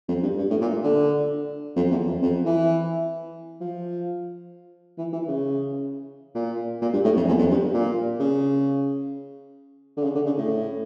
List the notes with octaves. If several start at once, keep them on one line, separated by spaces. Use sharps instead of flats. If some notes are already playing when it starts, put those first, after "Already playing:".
F2
G2
G2
A2
A#2
D3
F2
E2
F2
F2
E3
F3
E3
E3
C#3
A#2
A#2
G2
A2
F2
E2
F2
G2
A#2
C#3
D3
C#3
D3
C#3
A2